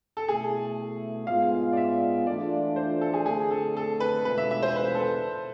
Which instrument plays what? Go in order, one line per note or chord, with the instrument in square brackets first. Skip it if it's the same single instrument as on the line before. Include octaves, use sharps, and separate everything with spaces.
[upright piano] A4
[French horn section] B2 A3 E4 [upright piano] G#4
[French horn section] G#2 G#3 B3 F4 [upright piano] F5
[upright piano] D5
E5
[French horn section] E3 A3 D4 F4 [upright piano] D5
[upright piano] C5
A4
G#4
[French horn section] D3 A3 C4 [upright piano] G#4
[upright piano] A4
A4
B4
[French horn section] E2 B2 G#3 D4 F4 [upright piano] B4
[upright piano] E5
E5
C5
B4
A4
B4